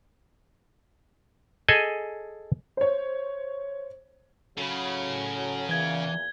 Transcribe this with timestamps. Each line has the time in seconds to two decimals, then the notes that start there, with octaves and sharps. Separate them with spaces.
1.68 G#4 A4 D#5 G#5
2.77 C5 C#5
4.58 C#3 F#3 A4 B5
5.69 E2 A#2 E3 G#6 G7